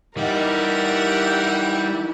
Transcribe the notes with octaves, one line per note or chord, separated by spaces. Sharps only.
E3 G3 D#4 G4 A#4 E5 F#5